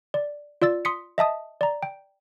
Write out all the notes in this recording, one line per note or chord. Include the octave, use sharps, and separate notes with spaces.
D5
F4 D5 E6 A6
C6 D#6 B6 C#7
D#5 E5 A5 D#6
D5 A#5
G5